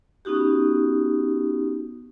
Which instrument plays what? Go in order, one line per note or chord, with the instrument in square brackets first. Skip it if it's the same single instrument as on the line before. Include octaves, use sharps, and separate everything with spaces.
[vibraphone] B3 C#4 D#4 F#4 G4